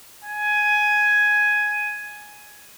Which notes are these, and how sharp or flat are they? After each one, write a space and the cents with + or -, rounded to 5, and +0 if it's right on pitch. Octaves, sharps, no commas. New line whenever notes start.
G#5 +10